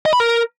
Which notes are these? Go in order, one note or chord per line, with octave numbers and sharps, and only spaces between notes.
D#5
B5
A#4